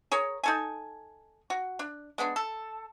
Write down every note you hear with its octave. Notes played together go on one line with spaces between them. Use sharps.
G#4 A#4 C#5
D#4 A4 G#5
F#4
D4
G#3 B3 C#4 D4
A4